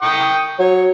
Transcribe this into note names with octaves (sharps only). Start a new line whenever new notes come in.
G5 C#6 D#6
F#3 C#5